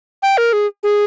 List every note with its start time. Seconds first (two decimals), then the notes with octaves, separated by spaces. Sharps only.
0.23 G5
0.38 A#4
0.53 G#4
0.83 G#4